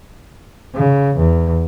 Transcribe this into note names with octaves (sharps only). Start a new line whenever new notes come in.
C#3
E2